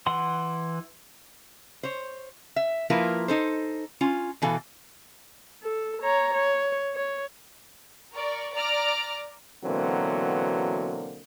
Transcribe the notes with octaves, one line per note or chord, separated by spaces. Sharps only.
E3 F#5 C6
C5 C#5
E5
F3 A#3 E4 F4 A#4 B4
D#4 A4 C5
C#4 F4
B2 E3 A4 F5
A4
C#5 A#5
C#5
C#5
A#4 D5 C#6
D5 A#5 D6 F6
B2 D3 E3 F#3 A#3 C4